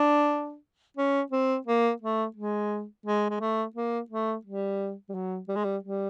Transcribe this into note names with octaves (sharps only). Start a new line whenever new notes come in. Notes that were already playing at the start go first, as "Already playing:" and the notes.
Already playing: D4
C#4
C4
A#3
A3
G#3
G#3
G#3
A3
A#3
A3
G3
G3
F#3
G3
G#3
G3
G3